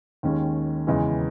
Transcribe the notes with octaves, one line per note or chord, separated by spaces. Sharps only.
D#2 D#3 G#3 C#4
E2 C#3 E3 G#3